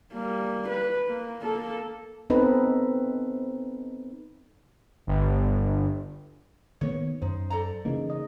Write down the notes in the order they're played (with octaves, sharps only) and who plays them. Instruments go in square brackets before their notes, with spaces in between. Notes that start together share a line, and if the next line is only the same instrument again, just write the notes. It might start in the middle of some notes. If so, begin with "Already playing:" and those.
[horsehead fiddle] G3 A#3
B4
A#3
A#3 A4
[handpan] B3 C4 D#4 A4 B4
[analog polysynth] G1
[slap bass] D#3 A#3 B3 [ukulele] C#5
[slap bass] F#2 [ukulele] D#4 [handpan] C5
[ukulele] A4 D5 A#5
[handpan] C#3 D#4 [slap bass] E3 A#3
[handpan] D#5